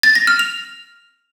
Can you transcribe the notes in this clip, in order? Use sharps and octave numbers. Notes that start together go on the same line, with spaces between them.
A6
A#6
F6
F7